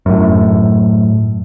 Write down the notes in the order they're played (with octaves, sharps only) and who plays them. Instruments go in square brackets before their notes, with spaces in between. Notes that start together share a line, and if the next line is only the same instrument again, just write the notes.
[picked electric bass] F#2 A2